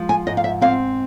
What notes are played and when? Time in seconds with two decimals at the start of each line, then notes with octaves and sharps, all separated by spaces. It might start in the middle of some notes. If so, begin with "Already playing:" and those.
Already playing: F3 G#3
0.09 G#5
0.27 G#2 D#5
0.37 F5
0.44 E5
0.61 C4 F5